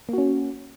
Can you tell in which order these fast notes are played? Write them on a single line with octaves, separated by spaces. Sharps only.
A#3 F#4 C#4